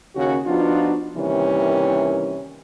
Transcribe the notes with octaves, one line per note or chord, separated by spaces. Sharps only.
D#2 C#3 C#4 F#4
F3 B3 D4 D#4 F4 F#4
C3 D#3 E3 G3 A#3 C#4